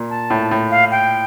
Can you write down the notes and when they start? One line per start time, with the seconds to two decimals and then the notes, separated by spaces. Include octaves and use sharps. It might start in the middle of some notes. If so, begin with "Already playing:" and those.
Already playing: A#2
0.10 A5
0.30 A2
0.51 A2
0.71 F5
0.91 G5